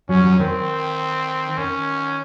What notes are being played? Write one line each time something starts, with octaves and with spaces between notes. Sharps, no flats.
F#3 C#4
F#3
D#3 C4
D#3 C#4